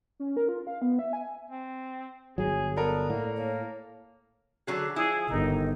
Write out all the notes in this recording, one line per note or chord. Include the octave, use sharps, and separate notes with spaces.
C#4
A#4
F4
F5
B3
E5
G#5
C4
G1 C#2 F#3 G#4
B3 A4 A#4 D5
A2 A#3
A#3 C#5
D3 F#3 G#4
F3 E4 G#4
G1 D#3 D#4